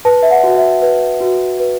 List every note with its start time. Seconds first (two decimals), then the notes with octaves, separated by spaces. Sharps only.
0.05 B4 A5
0.23 E5
0.31 F#5
0.44 F#4
0.56 E5
0.82 B4
1.21 F#4
1.59 B4